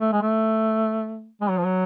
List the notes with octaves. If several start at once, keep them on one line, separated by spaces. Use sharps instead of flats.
A3
G#3
A3
G#3
F#3
F3
F#3